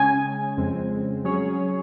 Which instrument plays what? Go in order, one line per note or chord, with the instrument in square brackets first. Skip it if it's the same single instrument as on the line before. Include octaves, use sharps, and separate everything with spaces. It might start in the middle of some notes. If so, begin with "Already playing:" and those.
Already playing: [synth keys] C#3 G#3 C#4 [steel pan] G#5
[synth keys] F2 C#3 G#3 C4
F#3 C#4 G#4 C#5